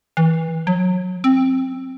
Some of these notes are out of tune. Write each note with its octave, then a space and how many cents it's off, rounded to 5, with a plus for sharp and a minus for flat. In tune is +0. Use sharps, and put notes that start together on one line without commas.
E3 -25
F#3 -25
C4 +10